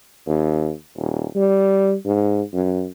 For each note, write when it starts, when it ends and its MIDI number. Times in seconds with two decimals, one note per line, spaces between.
0.26 0.71 39
0.97 1.26 27
1.35 1.94 55
2.06 2.42 44
2.53 2.87 42